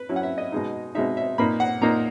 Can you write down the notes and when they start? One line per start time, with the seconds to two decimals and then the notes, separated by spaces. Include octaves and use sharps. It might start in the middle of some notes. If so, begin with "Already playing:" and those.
Already playing: B4
0.09 F#3 C#4 E4
0.16 F#5
0.23 E5
0.38 D#5
0.52 B2 G#3 D#4
0.95 B2 G#3 D#4 E5
1.17 E5
1.38 A#2 A#3 D#4 B5
1.60 F#5
1.81 A#2 A#3 D#4 A#5